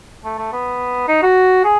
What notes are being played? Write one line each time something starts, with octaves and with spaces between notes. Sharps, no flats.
A3
A3
B3
D#4
F#4
G#4